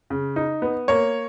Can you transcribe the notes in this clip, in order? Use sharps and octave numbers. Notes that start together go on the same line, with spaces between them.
C#3
D#4
B3
A#3 C#5